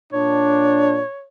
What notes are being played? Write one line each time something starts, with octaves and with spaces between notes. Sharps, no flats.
A#2 D4 C#5